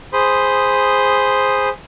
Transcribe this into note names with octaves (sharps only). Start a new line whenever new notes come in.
G#4 C5 B5 C6 D#6